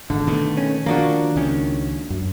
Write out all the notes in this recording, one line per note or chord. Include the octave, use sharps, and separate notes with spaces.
G#1 D3
B2 D#3 A3
C#4
D#3 F3 A#3 D4 F#4
C#2 D#3 C#4
F#2